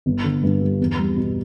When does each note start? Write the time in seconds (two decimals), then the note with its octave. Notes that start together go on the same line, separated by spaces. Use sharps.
0.06 G1
0.24 D3
0.43 G2
0.61 G3
0.80 E2
0.99 G3
1.16 B2